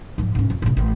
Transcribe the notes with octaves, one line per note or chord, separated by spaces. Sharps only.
G#2 F3
G#2 C#4
F2
A2 C#3
A1 E3